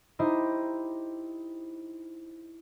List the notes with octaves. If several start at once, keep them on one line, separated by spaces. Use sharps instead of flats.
D#4 E4 G4 C5 D#5